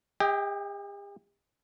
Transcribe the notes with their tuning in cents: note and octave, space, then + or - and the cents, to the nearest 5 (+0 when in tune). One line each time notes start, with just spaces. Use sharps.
G4 +45 D#5 +35 G5 +0